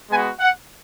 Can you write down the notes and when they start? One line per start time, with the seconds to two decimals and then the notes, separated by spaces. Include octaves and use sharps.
0.10 G#3 B3 F#4 G#5
0.39 F#5